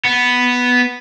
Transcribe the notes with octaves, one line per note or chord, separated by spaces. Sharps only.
B3